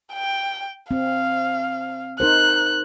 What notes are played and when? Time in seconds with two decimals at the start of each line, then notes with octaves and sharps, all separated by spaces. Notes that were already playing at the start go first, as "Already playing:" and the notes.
0.13 G5
0.91 C4 F5
2.20 D#4 A#4 C5 F#6